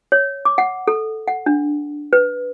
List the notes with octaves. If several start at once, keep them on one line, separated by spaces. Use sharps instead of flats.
C#5
D6
F#5
A4
F#5
D4
B4